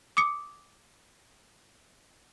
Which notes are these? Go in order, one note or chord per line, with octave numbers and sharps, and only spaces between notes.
D6 D#6 C#7